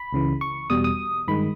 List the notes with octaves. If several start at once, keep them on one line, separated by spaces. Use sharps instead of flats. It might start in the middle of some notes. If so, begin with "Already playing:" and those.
Already playing: B5
C#2 C#3 E3
C#6
E2 B2 G3 D#6
D#6
G2 D#3 G#3 B5